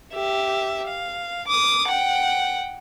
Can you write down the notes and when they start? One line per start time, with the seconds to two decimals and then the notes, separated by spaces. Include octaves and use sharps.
0.13 G4 E5
0.87 F5
1.47 D6 D#6
1.88 F#5 G5